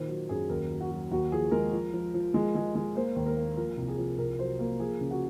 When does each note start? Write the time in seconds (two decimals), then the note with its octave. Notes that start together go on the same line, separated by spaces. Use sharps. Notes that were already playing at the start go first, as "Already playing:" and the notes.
Already playing: A#2 D#3 C5
0.08 F#3
0.29 F#2 G#4
0.49 D#2 A#4
0.71 F#3
0.81 F#4
0.90 F#3
1.11 D#2 F#4
1.32 F3 G#4
1.51 G#3 A#4
1.72 F3
1.93 F3
2.14 F3
2.34 G#3
2.55 G#3
2.75 G#3
2.95 A#3 C5
3.16 D#2
3.26 A#4
3.37 A#3
3.57 F3 A#4
3.77 C2
3.88 G#4
3.98 F3
4.18 C2 A#4
4.39 F#3 C5
4.59 A#3
4.80 F3 G#4
5.00 C#3
5.11 F#4